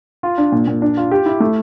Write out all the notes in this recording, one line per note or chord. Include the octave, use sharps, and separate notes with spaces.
F4
D4
A#2
A#2
D4
F4
G4
E4
A3